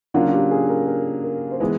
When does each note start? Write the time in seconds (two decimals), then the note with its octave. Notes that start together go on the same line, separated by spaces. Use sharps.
0.14 C#3 F#3 A#3 D4 F4 F#4
0.28 F#4
0.33 G4
0.51 G#4
0.69 A#4
0.88 A#4
1.23 A#4
1.51 C5
1.60 E3 G#3 B3 B4